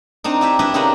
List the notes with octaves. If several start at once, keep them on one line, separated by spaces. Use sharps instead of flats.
C4 D4 D#4
E4 G4 E5
D4 E4 G4 B4 D#5
C#3 C4 D#4 G4 A#4 B5